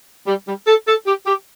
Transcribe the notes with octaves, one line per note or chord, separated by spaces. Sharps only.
G3
G3
A4
A4
G4
G4